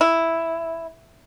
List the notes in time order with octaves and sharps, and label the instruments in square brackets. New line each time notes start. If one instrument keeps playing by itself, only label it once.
[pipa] E4